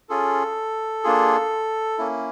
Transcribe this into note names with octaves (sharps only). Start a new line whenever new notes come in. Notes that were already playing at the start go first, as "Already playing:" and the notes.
C#4 F4 G#4 A4
A#3 D4 F4 G#4
A#3 C#4 E4